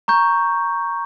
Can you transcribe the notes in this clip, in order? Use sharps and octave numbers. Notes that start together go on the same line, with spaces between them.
A#5 C#6 G6